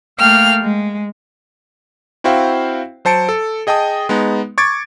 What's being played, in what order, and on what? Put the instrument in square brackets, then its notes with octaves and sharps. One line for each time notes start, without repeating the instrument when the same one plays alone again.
[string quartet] A3 A#3 F5 G5 F6
G#3
[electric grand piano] C4 E4 F#4 C5 F5 G5
F#3 C5 A5 C#7 D7
A4
G#4 D#5 G5 A5 D#6
G#3 B3 D#4
C#6 D6 G#6 A6 D7